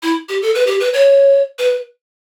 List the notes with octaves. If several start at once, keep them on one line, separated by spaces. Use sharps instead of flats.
E4
G4
A4
B4
G4
B4
C#5
B4